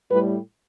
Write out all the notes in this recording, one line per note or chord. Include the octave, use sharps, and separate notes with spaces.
A2 G3 B4